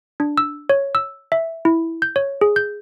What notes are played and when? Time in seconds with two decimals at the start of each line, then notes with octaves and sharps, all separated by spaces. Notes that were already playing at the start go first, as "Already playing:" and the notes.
0.20 D4
0.38 E6
0.70 C#5
0.95 E6
1.32 E5
1.65 E4
2.02 G6
2.16 C#5
2.41 G#4
2.56 G6